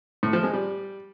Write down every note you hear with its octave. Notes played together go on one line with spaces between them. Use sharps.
A2
F3
G#3
G3